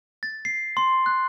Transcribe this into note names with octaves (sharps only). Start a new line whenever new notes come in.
A6
C7
C6
F#6